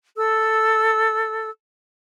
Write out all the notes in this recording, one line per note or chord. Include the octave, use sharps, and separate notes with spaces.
A4 E6